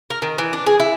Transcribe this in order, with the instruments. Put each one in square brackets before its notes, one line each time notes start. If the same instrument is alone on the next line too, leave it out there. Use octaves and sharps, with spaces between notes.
[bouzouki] A#4
D#3
E3
D4
G#4
E4